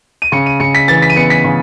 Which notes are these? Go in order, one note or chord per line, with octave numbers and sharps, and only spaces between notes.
D#7
C#3 C#7
D#7
C#3 C#7
B6
E3 A6
B6
D#7
B3 C#7
B6
C#3